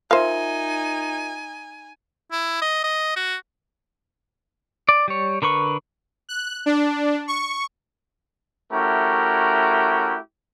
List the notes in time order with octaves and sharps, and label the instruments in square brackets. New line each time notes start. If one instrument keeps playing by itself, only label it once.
[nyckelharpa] D#4 [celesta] F4 A#4 E5 [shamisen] C5 F5 [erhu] G#5
[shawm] E4
D#5
D#5
F#4
[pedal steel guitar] D5
G3 C#5
D3 A#4 B4 C#6
[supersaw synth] F#6
D4
C#6
[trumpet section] A3 C#4 E4 F#4 G4 A#4